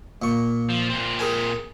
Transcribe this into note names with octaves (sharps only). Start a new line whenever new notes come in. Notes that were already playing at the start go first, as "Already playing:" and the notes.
A#2 C#6
F3
A#2 C4
G#4 A#4 G#5